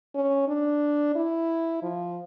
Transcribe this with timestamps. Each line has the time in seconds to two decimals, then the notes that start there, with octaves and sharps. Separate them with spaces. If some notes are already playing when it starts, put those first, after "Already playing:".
0.15 C#4
0.48 D4
1.15 E4
1.83 F3